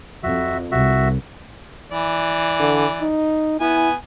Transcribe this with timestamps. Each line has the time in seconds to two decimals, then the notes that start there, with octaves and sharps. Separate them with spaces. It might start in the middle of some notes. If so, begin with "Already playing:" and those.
0.23 F2 F#4 E5
0.71 C2 F#4 E5
1.92 E3 D5
2.60 D3
3.01 D#4
3.60 B3 E4 G#5